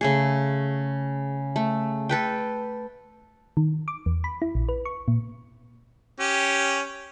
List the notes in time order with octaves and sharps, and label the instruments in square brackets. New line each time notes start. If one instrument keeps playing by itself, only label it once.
[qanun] C#3 A3 G#4
A3
A4 B4 G5
[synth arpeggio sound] D#3
D6
E2
B5
E4
A#1
B4
C#6
A#2
[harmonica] C#4 G4